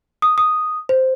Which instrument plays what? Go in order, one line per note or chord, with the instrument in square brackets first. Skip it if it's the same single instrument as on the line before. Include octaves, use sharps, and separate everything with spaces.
[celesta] D#6
D#6
C5